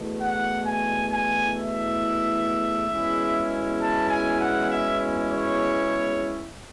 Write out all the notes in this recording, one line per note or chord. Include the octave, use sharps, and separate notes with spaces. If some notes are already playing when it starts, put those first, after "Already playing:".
Already playing: E2 B2 A3 E4
F#5
G#5
G#5
E5
E2 B2 G#3 C#4 E4
A5
G#5
F#5
E5
C#5